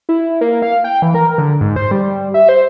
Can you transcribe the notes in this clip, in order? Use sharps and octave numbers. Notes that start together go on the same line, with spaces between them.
E4
A#3
F5
G5
E3
A#4
D3
G#2
C5
G3
E5
C5